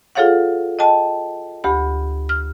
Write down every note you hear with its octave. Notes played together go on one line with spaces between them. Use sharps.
F4 G#4 A4 C#5 F5 F#5
D#5 G5 A5
D2 G4 B5
F6